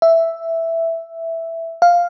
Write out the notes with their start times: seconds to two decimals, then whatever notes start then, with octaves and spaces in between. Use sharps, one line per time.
0.02 E5
1.82 F5